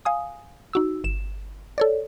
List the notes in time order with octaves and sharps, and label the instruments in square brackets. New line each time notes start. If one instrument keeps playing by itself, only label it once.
[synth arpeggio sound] F5 G#5 D#6
D#4 F#4 E6
G1 E7
A4 C#5 D5